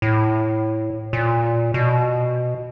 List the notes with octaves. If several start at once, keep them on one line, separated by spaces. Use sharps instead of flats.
A2
A#2
B2